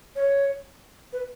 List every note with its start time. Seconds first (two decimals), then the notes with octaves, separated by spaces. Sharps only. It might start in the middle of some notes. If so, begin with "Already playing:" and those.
0.16 C#5
1.13 B4